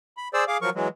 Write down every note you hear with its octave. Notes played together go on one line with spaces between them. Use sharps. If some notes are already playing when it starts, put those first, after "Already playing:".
B5
G#4 C5 D5 E6
G#4 F5 D6
F3 F#3 A#4 C#6
E3 F#3 G#3